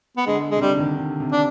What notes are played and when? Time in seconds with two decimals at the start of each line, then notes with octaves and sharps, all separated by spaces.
0.17 B3
0.27 D3 G#3
0.51 G#3
0.56 C3
0.61 D3 G3
0.75 D3
0.80 D#3
0.97 D3
1.20 C3
1.32 D4